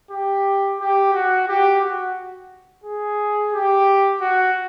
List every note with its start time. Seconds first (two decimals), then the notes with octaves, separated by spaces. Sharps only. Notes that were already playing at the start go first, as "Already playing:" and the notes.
0.11 G4
0.80 G4
1.13 F#4
1.48 G4
1.81 F#4
2.84 G#4
3.52 G4
4.21 F#4